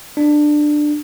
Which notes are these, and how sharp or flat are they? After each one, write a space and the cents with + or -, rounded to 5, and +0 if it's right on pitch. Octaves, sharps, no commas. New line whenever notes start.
D4 +15